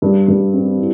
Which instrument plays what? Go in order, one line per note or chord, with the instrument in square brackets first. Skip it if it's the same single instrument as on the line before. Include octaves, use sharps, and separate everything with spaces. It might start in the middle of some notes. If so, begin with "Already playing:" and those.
[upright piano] G2
G2
C4
E4